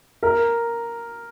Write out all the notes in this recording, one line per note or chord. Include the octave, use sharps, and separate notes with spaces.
A#4